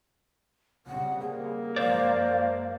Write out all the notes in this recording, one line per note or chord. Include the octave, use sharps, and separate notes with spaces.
C#3 G3 C4 F#5
A#3 G#4
F#2 F3 G#3 C5 D5 F5